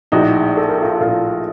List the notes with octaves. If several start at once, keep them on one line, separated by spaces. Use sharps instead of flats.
A#1 A2 D#4 F#4
A4
A#4
F4 A4
A#1 A2 F4 A4